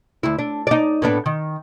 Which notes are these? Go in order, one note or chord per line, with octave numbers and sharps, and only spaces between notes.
D2 E4
D4
D#4 D5
A2 B3 D4
D#3